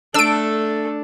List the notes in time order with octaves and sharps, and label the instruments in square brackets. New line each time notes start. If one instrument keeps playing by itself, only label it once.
[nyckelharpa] A3 A4 [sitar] D4 [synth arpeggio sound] E6 D7